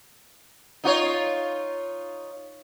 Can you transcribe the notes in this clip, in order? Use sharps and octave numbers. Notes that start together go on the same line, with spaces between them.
D#4 F4 C#5